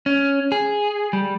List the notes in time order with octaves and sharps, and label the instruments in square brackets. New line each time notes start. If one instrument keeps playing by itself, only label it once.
[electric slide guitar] C#4
G#4
G3